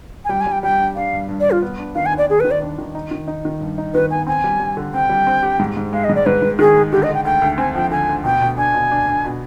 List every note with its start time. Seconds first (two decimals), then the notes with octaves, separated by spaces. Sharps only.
0.25 G#5
0.29 G3 G5
0.41 G#5
0.46 G3
0.52 G5
0.63 G3 G5
0.79 D4
0.96 D4 F5
1.13 G2
1.29 G2
1.40 D5
1.45 G2
1.51 F4
1.62 B3
1.78 D4
1.95 D#3 F5
2.06 G#5
2.12 D#2
2.18 D5
2.28 D#2 G#4
2.40 B4
2.44 D#3
2.51 D5
2.62 D4
2.79 D#3
2.95 D#4
3.11 D#3
3.27 D#4
3.45 D#3
3.61 G2
3.78 D#4
3.94 D#3 B4
4.11 B3 G#5
4.27 C4 G#5
4.44 G3
4.60 G3
4.77 D3
4.94 C4 G5
5.09 G3
5.27 C4
5.43 G4
5.59 G#2
5.77 G#2
5.93 G#3 F5
6.04 D#5
6.09 G#2
6.15 D5
6.26 G#2 B4
6.42 G#2
6.59 D#3 G#4
6.76 G#3
6.92 D3 G4
7.03 D#5
7.09 D3
7.14 G5
7.25 D2 G5
7.42 D2
7.58 C4 G#5
7.75 F3 G5
7.91 D3 G#5
8.09 D2
8.24 B2 G5
8.41 B2
8.57 D4 G#5
8.74 B2
8.91 D4
9.08 D4
9.25 B2